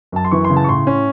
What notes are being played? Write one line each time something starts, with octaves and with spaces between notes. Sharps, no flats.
F#2 A5
C6
E3 C#6
C6
C#3
A5
C#6
A2 C6
C#4